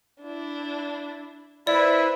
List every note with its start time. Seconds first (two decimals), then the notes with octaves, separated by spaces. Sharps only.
0.22 D4 E4
1.67 E4 B4 C5 D5 E5